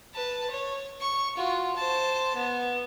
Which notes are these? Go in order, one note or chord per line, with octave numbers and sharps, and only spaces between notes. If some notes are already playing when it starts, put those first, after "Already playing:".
B4 A5
C#5
C#6
F4 F#4
C5 A5
B3